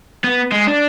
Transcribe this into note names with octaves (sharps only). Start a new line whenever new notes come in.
B3
G#3
D4